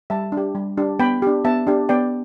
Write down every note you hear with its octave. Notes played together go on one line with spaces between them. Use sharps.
G3 E5 A5
D4
G4
G3
D4 G4
B3 G5 B5
D4 G4
B3 E5 A5
D4 G4
B3 D5 G5